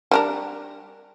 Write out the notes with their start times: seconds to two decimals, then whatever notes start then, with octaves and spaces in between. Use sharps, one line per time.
0.11 G3 D4 A#4